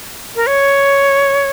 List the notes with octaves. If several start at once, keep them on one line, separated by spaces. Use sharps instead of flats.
A#4
C#5